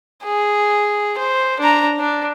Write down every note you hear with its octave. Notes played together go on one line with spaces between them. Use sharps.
G#4
C5
D4 A#5
D4